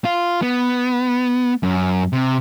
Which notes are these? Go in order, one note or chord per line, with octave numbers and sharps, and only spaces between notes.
F4
B3
F#2
C3